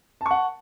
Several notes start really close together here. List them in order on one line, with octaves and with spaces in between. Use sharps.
A5 C#6 F#5